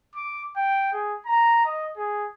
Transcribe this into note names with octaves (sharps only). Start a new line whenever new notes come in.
D6
G5
G#4
A#5
D#5
G#4